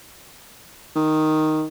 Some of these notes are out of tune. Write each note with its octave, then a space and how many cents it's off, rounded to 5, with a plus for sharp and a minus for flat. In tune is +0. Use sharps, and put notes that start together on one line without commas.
D#3 +0